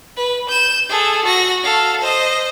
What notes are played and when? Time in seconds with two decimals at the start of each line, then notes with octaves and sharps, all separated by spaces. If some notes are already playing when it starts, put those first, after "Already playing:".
0.17 B4
0.49 G6 E7
0.89 G#4 A4
1.25 F#4 A#6
1.63 A4 F5
2.01 C5 D#5